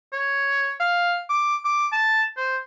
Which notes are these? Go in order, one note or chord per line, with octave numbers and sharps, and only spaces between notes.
C#5
F5
D6
D6
A5
C5